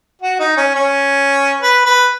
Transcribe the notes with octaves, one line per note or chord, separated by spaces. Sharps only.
F#4
D#4
C#4
C#4
B4
B4